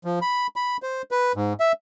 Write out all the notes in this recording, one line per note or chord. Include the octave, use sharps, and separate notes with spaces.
F3
B5
B5
C5
B4
G#2
E5